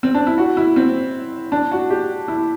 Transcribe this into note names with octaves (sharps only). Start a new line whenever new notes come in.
C4
D4
E4
F#4
E4
C4
D4
F#4
G4
E4